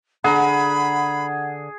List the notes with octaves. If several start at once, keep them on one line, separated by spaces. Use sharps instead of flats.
D3 G#4 F#5 A#5 B5